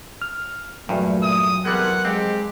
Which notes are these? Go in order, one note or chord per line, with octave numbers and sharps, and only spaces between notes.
F6
E2 G2 A#2 F#3 A3
D#6
E2 C3 G3 G#3 A4 A#4 F#5
F2 G#3 C4 G4